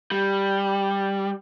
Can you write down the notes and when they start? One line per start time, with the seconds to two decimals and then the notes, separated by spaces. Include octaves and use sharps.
0.11 G3